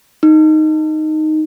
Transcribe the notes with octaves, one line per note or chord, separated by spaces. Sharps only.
D#4